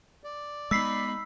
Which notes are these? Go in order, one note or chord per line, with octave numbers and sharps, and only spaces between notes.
D5
G#3 B3 D#4 B5 E6 B6 C7